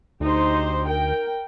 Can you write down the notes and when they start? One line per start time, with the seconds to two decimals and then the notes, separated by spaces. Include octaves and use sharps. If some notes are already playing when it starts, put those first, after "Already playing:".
0.20 D2 D#4 G4 C5
0.87 A#4 G5